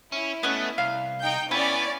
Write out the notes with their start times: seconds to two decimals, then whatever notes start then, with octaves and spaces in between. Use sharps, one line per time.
0.12 C#4 E4
0.43 A3 B3 C#4 D#5
0.78 C2 F5
1.20 D#4 G5 G6
1.51 B3 C#4 E4 D5